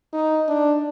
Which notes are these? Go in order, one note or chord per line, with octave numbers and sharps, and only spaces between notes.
D#4
D4